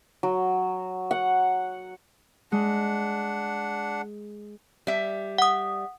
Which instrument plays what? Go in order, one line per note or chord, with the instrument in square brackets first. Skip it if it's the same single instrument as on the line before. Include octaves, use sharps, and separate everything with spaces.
[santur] F#3
F#5
[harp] G#3 [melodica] D4 F#5
[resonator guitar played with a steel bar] G3 E5
[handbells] F#5 D#6